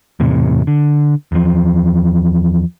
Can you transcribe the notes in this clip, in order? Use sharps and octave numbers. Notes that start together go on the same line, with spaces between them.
E2 A2 C3
D3
E2 F3